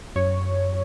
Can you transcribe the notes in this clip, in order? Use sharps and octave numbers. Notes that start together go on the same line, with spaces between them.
F#2 C#5